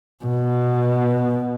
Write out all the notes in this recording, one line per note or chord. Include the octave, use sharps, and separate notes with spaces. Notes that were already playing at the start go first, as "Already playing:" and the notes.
B2